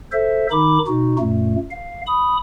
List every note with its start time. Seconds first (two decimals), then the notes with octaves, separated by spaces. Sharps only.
0.12 A4 C5 E5
0.51 D#3 D#4 B5 D6
0.87 B2 D#4 F#4
1.19 F#2 A#2 A3
1.70 F5
2.07 B5 D#6